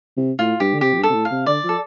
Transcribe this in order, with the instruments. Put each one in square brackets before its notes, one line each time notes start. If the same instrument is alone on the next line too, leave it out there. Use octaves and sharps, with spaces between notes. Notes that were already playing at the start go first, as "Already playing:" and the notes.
[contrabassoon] C3
[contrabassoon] A2 [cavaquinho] F4
[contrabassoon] G2 [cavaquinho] G4
[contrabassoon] D3
[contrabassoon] C3 [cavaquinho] G4
[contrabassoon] F2
G2
[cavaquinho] A4
[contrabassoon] C3
A2
[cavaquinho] F5
[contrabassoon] C3
[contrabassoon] D3 [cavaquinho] D5
[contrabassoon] F3
[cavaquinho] A4